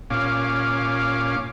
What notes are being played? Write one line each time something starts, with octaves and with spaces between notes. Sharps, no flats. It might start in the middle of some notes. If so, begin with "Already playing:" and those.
A#2 C#4 F5 D6